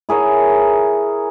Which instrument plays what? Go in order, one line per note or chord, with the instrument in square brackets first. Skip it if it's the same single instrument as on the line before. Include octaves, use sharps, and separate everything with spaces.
[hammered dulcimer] E4 G#4 A#4 C#5